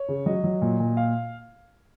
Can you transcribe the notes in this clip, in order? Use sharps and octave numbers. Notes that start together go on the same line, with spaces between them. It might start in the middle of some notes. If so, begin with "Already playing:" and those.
Already playing: C#5
C#3
F#3 D#5
F#3
A#2
A#2
F5